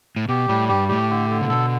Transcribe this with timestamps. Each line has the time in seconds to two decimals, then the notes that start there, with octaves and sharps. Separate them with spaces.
0.16 A2
0.29 B2 G4
0.48 A2 G3
0.69 G2 G4
0.89 A2 G4
1.10 D3
1.30 D3
1.41 C#3
1.49 B2 A4